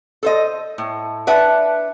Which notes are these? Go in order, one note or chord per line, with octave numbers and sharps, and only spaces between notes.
A4 C5 D#5
A2
D4 B4 E5 F#5